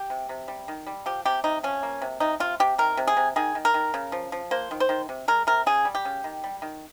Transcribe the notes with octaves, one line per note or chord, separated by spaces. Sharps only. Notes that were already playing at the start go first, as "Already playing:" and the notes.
Already playing: G4
C3
C3
G3
D#3
G3
F3 G4
C3 G4
C3 D#4
F3 C#4
A#3
C3
C3 D#4
C3 F4
C3 G4
D#3 A#4
C3
G#4
C3
D#3 G#4
D#3
A#4
D#3
C#3
F3
F3
A#3 C5
D#3
C5
D#3
C3
G#3 A#4
C3 A#4
C#3 G#4
G3
G4
C#3
D#3
G3
D#3